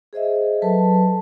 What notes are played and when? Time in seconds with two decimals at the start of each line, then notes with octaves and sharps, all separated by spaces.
0.13 G#4 C5 D#5 E5
0.62 F#3 A4 B4 A5